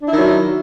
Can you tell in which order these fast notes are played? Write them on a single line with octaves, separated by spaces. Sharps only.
D4 E4 D#3 F#3